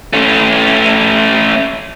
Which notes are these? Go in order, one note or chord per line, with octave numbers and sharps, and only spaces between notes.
A3 C#4